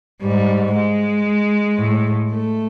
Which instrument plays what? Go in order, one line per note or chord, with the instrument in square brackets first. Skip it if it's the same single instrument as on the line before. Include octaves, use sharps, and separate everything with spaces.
[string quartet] G#2 [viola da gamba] G3
[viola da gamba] G#3
[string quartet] A2
[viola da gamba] A3